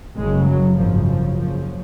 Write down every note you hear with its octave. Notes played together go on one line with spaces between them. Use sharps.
F#1 F#2 C#3 G#3
F#3
G#1 F#2 C#3 F3
F3
F#1 F#2 C#3 F3